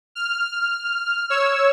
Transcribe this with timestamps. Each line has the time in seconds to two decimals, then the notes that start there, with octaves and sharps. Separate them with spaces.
0.15 F6
1.30 C#5 E6